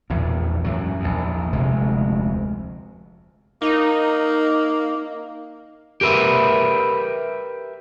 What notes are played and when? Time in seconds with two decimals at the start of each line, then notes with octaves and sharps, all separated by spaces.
0.10 A#1 E2 A2
0.64 F#2 A2 F#3
1.00 A#1 E2
1.53 F1 D2 C3 G#3
3.62 A#3 D#4
6.01 G4 A#4 B4 E5